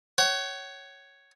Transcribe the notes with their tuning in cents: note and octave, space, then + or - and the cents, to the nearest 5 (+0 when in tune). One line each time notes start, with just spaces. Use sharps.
C#5 +0 F#5 +40